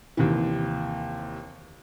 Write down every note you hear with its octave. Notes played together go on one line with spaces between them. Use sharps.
D#2 C3 E3